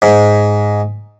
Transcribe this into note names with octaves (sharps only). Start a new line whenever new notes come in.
G#2